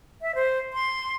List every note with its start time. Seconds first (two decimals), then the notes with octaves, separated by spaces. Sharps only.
0.22 E5
0.35 C5
0.73 C6